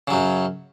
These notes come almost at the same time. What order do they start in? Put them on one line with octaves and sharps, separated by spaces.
C#3 F#3 F#2